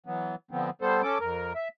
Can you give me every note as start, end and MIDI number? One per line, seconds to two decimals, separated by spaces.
0.06 0.35 52
0.06 0.35 54
0.06 0.35 59
0.51 0.70 50
0.51 0.70 53
0.51 0.70 59
0.51 0.70 60
0.82 1.02 55
0.82 1.02 59
0.82 1.02 69
0.82 1.02 72
1.03 1.18 61
1.03 1.18 69
1.03 1.18 86
1.20 1.53 41
1.20 1.53 70
1.55 1.68 76